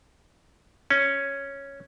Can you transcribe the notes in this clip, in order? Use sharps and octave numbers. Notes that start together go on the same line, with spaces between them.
C#4